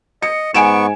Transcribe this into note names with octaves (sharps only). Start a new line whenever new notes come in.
D#5 C#7
G#2 B3 G#5 C#6 D7 E7